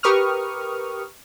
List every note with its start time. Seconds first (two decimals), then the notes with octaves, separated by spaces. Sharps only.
0.03 G4 A#4 B4 C#6 D#6 F6